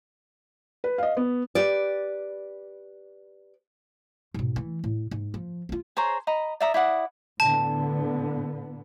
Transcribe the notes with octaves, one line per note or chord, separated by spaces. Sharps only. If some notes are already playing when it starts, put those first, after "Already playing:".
B4
D#5 F5
B3
G4 B4 D5
G#2 B2
E3 A3
A2
G#2
F3
C4 F4
G#4 C5 C#5 A#5
D#5 A#5 B5
D5 E5 A#5 D#6
E4 D5 F#5 D#6
A2 D3 B3 A5